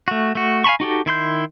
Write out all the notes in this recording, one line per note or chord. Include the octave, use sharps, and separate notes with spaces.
A3 F#4
A3 F#4
F5 G#5 A5 B5 C#6
D#4 F#4 G4 A4
D#3 E4 C6 G6